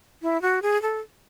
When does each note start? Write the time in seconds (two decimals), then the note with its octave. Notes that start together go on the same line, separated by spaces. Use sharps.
0.22 E4
0.42 F#4
0.62 G#4
0.82 A4